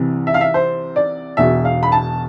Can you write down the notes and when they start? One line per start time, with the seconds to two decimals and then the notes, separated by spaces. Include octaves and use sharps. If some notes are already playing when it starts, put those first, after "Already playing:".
Already playing: C2 C3 E3
0.27 E5
0.34 F5
0.41 E5
0.54 C5
0.96 D5
1.37 E1 E2 B2 E5
1.65 F5
1.83 B5
1.92 A5